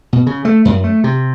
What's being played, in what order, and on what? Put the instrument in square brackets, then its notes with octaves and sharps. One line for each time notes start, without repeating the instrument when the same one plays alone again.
[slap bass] B2
C#3
A3
F#2
A3
C3